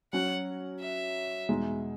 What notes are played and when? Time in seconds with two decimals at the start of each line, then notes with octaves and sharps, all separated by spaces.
0.13 F#3 C#4 F#4 F#5
0.81 E5
1.49 E2 B2 G#3 D#4